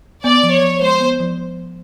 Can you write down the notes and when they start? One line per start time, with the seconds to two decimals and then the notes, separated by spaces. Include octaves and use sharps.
0.24 B3 D5
0.43 F3
0.52 C#5
0.62 F3
0.81 G#3 C5
1.00 B3
1.20 F3